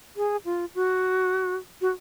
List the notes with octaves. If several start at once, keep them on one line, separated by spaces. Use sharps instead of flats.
G#4
F4
F#4
F#4